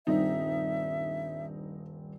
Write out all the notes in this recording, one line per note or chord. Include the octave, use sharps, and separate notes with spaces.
D#1 G2 C4 D#4 E5